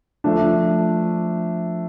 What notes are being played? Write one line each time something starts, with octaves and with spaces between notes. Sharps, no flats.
F3 A3 D4